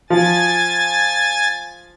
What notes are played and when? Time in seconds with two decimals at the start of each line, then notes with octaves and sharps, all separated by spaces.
0.10 F3 G#5 A6